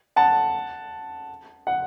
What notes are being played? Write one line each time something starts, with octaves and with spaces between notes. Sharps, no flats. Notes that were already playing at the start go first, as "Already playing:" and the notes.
F#5 A5
F#5